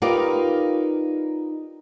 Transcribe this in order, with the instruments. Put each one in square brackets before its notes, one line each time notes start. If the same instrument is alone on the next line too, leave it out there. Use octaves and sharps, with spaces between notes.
[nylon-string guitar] D#4 F4 G4 A#4 B4 D5